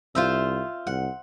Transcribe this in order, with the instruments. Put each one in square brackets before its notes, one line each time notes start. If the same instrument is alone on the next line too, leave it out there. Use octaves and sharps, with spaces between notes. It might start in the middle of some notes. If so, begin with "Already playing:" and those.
[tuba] C2 [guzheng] F4 C5 E5
[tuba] C2 [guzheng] F#5